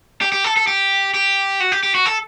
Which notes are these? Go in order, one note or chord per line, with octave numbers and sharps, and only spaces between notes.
G4
G4
A4
A4
G4
G4
F#4
G4
G4
F#4
A4